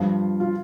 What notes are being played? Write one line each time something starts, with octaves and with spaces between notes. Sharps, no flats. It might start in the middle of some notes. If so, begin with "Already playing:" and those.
Already playing: G2 F3 F4
F4